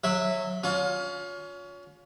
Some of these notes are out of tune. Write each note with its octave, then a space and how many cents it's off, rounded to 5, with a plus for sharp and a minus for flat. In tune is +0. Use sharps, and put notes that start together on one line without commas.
F#3 -20 E5 -5
C#4 +30 F4 +35